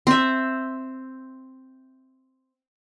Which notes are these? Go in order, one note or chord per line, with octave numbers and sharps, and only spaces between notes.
C4 E5